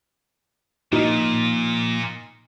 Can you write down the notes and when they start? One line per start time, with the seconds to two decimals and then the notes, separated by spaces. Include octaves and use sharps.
0.93 A#2 F3 A#3 D#4